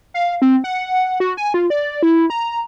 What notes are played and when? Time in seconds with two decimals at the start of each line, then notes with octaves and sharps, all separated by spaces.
0.14 F5
0.42 C4
0.64 F#5
1.20 F#4
1.37 G#5
1.54 F4
1.70 D5
2.03 E4
2.30 A#5